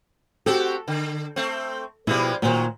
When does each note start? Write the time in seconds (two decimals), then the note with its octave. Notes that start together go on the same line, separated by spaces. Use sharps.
0.46 C4 F#4 G4 A4
0.88 D3
1.36 A3 C4
2.07 B2 F3 G3 G#3 E4
2.42 A#2 D#3 F#3 C5